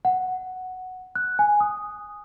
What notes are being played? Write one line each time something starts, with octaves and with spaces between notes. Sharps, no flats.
F#5
F#6
G#5
D#6